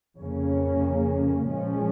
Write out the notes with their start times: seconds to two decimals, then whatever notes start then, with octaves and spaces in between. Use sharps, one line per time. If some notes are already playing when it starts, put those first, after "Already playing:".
0.19 F2 C#3 A#3 C#4
1.48 A#2 F3 G#3 C#4